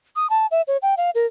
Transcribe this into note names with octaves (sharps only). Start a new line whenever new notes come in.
D#6
A5
E5
C#5
G5
F5
A#4